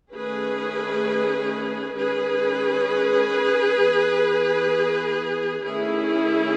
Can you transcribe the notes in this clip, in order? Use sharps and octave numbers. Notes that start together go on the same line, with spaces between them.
D#3 A3 C#4 G#4 B4
D#3 G#3 C#4 G#4 B4
E3 B3
D#3 A3 C#4 E4 G#4